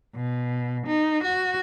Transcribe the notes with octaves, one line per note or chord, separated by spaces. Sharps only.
B2
D#4
F#4